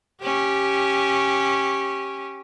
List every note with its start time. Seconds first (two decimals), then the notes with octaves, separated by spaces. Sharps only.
0.22 C#4 G4